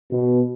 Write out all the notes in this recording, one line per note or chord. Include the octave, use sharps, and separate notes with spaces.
B2